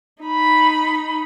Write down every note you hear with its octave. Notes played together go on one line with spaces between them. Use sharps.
D#4 B5